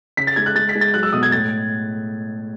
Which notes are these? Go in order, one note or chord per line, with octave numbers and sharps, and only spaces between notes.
C#3 B6
A6
G#3 G#6
F#6
G#3 A6
B6
G#3
A6
F#3 F#6
E6
B2 D#6
G#6
A2 A6